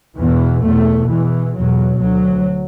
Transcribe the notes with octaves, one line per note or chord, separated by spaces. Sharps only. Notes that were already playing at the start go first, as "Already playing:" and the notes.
E2 B2 E3
E2 B2 A3
E2 B2 E3
E2 B2 F#3
D2 F#3